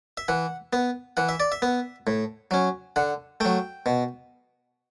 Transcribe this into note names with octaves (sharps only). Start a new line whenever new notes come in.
E5
E3 F#5
B3
E3 F#5
E5
D5
E5
B3
A2
F#3 C#4
D3 F#5
F#3 A3 G5
B2